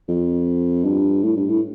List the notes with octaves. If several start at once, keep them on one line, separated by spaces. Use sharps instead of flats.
F2
G2
A2
G2
A2